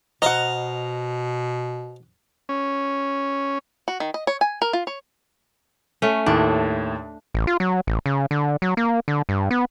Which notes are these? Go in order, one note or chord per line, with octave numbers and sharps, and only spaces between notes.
B2 C5 D#5 F5 F#5 A#5
C#4
F#4
D#3
D#5
C#5
G#5
A#4
F4
C#5
A3 C#4
D#2 A2 D4
A1
F4
F#3
A1
C#3
D3
F#3
A#3
D3
G2
B3